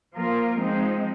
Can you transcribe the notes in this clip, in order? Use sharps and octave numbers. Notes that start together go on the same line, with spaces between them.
F3 A#3 F4 A#4
F3 G#3 C4 D#4